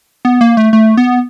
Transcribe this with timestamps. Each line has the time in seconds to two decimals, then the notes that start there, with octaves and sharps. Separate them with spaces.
0.25 B3
0.41 A#3
0.57 A3
0.73 A3
0.97 B3